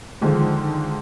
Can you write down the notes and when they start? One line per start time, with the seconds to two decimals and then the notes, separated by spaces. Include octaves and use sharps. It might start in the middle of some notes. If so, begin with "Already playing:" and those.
0.21 G#2 D3 D#3 F3 G#3 C4